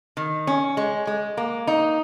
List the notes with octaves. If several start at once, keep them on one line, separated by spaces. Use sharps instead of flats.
D#3
C#4
G#3
G#3
A#3
D#4